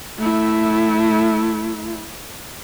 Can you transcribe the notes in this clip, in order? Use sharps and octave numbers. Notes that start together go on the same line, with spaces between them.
A3 E4